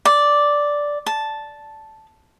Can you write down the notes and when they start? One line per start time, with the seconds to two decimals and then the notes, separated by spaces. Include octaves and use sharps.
0.05 D5
1.06 A5